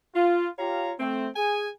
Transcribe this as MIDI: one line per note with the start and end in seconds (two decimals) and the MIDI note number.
0.14 0.48 65
0.58 0.92 65
0.58 0.92 67
0.58 0.92 73
0.58 0.92 77
0.58 0.92 82
0.99 1.28 57
0.99 1.28 60
1.36 1.68 68
1.36 1.68 80